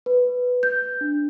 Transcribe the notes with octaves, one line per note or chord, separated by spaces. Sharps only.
B4
G6
D4